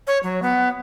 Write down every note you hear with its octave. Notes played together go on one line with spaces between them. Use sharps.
C#5
F#3
B3